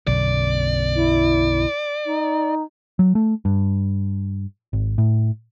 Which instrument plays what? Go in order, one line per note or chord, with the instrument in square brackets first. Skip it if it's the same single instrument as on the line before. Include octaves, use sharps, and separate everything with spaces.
[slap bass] B1 F#2 D3 [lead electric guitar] D5
[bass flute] E4
D#4
[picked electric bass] F#3
A3
G2
G#1
A2